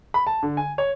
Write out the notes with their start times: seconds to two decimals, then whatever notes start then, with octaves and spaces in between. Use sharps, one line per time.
0.14 B5
0.27 A5
0.43 D3
0.57 G#5
0.78 C#5